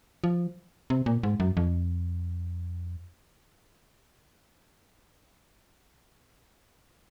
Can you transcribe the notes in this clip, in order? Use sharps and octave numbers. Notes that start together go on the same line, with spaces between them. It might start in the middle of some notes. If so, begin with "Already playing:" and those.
F3
C3
A#2
G#2
F#2
F2